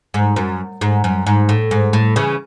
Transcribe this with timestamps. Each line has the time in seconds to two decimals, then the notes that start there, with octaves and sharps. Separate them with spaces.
0.14 G#2
0.36 F#2
0.81 G#2
1.04 F#2
1.27 G#2
1.49 A2
1.71 G#2
1.93 A2
2.16 C#3 E3